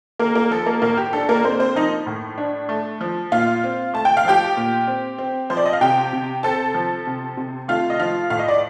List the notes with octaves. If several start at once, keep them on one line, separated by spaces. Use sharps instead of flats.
A#3 A#4
A#3 A#4
F3 A4
A#3 A#4
A2 A#3 A#4
G4
D4 A4
A#3 A#4
A#3 C4 C5
C4 C5
F3 D#4 D#5
A2
D4
A3
F3
A#2 F4 F5
C4
A3 A5
G5
F5
F3 G4 G5
A#2
C4
C4
F3 C5
D5
D#5
F5
C3 G4 G5
C3
C4 A4 A5
F3
C3
C3
A3 F4 F5
D#5
F3 F4 F5
A2 F5
D#5
D5